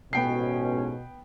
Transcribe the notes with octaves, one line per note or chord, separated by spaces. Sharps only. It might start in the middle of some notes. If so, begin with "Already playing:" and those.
A1 G#2 B2 B3 C#4 G5 C7